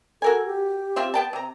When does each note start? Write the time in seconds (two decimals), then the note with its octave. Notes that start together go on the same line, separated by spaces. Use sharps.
0.22 F#4 A4 A#4 G#5
0.46 G4
0.96 C4 F4 E5
1.14 B3 G5 A5
1.33 C3 A#5